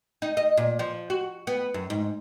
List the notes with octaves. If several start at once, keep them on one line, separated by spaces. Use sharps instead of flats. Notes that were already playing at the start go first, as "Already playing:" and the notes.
D#4
D#5
A#2
F3
F#4
B3
F#2
G#2